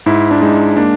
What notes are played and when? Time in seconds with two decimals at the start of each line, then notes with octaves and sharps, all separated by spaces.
0.06 G#2 E4
0.31 D4
0.41 G#3 D#4
0.77 A#3 D4